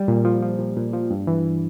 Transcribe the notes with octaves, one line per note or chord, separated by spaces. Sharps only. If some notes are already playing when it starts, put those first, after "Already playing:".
Already playing: G3
A#2
F3
F3
A#2
A#2
F3
G2
E3